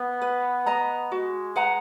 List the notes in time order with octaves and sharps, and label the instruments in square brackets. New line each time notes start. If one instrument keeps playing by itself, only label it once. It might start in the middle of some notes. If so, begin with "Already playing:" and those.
Already playing: [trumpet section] B3
[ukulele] B4
D#5 A#5
[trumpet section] G#3 [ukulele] F#4
[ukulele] B4 F#5 A#5